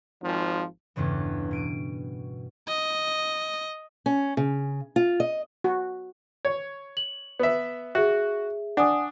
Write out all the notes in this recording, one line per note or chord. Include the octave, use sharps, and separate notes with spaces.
G#1 F3
A1 E2 G2 C#3 E3
B2 D7 D#7
D#5
C#4
C#3
F4
D#5
F#4
C#5
F#7
B3 E5
F#4 G#4 E5
D4 F#5 G#5 D#6